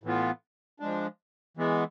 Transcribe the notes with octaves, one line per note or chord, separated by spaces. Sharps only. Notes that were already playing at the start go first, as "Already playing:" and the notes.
A2 E3 B3 F4
F3 G#3 D4
E3 G#3 B3